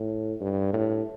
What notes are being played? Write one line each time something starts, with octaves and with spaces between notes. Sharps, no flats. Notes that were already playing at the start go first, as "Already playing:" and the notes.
Already playing: A2
G2
A2